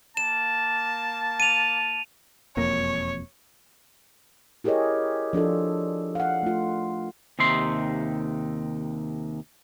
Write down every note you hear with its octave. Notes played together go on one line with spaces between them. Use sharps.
A#3 A5 E7
D#7 F7
E1 F2 A#3 C#5
E4 G4 G#4 A#4 C#5 D#5
F3 D4 F4 A4
F5 F#5
A3 F4
D#2 C3 D#4 E5 C6